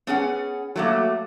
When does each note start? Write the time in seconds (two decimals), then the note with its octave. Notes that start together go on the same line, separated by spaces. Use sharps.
0.07 B3 C#4 G#4 F#5
0.76 F#3 A3 A#3